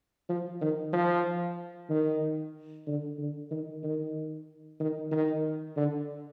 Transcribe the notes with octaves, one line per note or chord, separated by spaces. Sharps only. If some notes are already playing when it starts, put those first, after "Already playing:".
F3
D#3
F3
D#3
D3
D3
D#3
D#3
D#3
D#3
D3